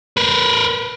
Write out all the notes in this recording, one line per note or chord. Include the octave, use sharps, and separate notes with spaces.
A#4 B4